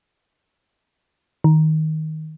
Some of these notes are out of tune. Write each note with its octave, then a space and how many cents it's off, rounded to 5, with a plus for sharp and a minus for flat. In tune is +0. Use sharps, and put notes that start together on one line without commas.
D#3 +10